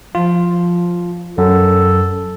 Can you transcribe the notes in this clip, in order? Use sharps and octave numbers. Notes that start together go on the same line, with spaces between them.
F3 F4
F#2 A4